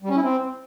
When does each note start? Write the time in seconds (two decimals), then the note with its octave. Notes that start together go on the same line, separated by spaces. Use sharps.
0.03 G3
0.09 C#4
0.16 E4
0.23 C4